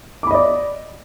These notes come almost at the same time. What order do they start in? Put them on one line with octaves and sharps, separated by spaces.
D6 B5 D#5 D5